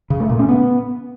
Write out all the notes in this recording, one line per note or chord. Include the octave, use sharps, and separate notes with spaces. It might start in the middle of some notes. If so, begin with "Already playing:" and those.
C#3
A3
A#2
C#4
B3